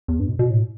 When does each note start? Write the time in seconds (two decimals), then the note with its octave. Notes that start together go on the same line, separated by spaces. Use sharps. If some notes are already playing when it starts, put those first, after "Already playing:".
0.08 E2
0.20 G2
0.29 B2
0.39 B2
0.50 A2